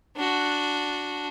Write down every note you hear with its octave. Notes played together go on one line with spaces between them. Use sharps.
D4 F#4